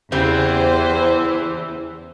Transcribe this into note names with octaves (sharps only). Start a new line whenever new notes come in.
E2 C#3 E3 C4 G4 C5